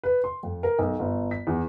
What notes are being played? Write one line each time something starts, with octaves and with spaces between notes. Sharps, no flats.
B4
C6
F2
A#4
B1
G1
B6
E2